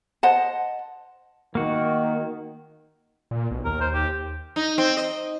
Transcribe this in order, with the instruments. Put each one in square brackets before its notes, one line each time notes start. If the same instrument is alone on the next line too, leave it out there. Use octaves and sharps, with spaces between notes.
[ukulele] C5 D#5 F#5 A5
[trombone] D#3 [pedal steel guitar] A#3 F#4
[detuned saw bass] A#2
B1
[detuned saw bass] D#2 [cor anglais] A#4
[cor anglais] C5
G4
[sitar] D#4
C4
D#5